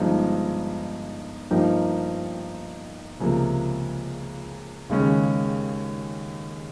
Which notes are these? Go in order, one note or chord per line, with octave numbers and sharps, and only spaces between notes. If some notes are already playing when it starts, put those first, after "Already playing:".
Already playing: G1 G2 F3 G#3 D#4
G2 F3 A#3 D#4 G4
C#2 C3 F3 A#3
D#2 C#3 G#3 C#4